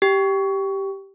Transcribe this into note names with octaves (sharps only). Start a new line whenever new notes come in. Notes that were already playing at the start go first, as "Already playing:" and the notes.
G4